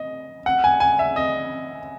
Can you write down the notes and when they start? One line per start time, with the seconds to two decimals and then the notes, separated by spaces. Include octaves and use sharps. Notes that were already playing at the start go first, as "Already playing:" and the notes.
Already playing: D#5
0.46 F#5
0.64 G#5
0.80 G#5
0.99 E5
1.16 D#5